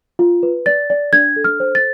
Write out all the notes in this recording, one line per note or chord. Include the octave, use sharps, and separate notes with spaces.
F4
B4
D5 A6
D5
D4 G#6
A4
F6
C5
A6